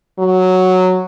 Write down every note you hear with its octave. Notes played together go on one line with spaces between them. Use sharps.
F#3